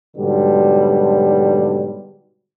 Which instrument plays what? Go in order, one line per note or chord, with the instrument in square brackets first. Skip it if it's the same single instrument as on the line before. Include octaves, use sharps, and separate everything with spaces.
[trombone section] G#2 B2 D3 F#3 G3